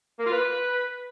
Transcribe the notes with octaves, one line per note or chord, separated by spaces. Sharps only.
A#3
F4
B4